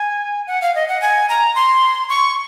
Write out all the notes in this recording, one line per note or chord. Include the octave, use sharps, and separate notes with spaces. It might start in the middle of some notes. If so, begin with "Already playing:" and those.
Already playing: G#5
F#5
F5
D#5
F#5
G#5
A#5
C6
C#6